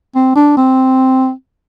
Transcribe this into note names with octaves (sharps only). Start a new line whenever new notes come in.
C4
D4
C4